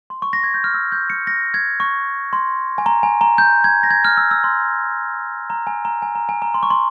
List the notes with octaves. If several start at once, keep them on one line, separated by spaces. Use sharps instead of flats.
C6
C#6
A#6
G#6
G6
F6
E6
G6
C#7
A#6
G#6
C#6
C6
G#5
A#5
G#5
A#5
G6
G#6
A#6
G#6
F6
E6
E6
C6
A#5
G#5
A#5
G#5
A#5
G#5
A#5
C6
C#6
C6